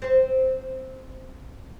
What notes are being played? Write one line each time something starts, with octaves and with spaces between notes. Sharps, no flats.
C4 C5